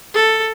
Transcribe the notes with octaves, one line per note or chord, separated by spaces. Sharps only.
A4